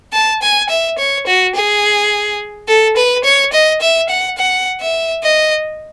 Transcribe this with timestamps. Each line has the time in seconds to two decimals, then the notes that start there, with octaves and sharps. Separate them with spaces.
0.13 A5
0.42 G#5
0.70 E5
0.98 C#5
1.27 F#4
1.55 G#4
2.68 A4
2.97 B4
3.25 C#5
3.53 D#5
3.81 E5
4.10 F#5
4.38 F#5
4.81 E5
5.23 D#5